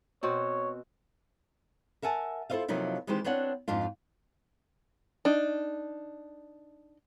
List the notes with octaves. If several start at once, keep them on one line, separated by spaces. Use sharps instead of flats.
B2 C4 F#4 C#5
A#4 E5 F#5 G#5 A5
E4 F4 A4 C5 D#5 F5
C3 F3 F#3 A#3 D#4 E4
D#3 E3 G#3 C4 G4 C5
B3 C4 D4 C#5 F#5
F2 G#2 D4 F4
D4 D#4